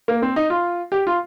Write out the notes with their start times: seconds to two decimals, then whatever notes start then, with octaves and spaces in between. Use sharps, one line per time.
0.08 A#3
0.22 C4
0.36 D#4
0.50 F4
0.92 G4
1.07 F4